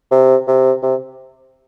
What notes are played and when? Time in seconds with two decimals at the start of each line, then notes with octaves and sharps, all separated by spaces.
0.11 C3
0.48 C3
0.82 C3